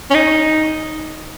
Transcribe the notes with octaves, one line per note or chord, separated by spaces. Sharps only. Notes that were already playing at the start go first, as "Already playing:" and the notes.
C#4
D#4